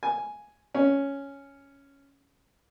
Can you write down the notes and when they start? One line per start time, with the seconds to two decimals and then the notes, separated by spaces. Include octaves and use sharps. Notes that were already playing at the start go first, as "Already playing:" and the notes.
0.03 G#5
0.74 C#4